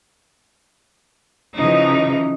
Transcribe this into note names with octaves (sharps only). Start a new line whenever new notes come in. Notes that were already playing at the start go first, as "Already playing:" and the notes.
C#3 E3 F3 D#4